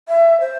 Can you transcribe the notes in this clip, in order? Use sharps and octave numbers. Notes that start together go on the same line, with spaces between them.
E5
C5